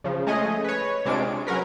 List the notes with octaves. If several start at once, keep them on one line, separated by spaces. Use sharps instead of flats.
C#3 F3
G#3 A3 C#4 G#4 D#5
B4 C#5
C3 G#3 C4 D4 F4 D7
G#3
F#3 C#4 A#4 B4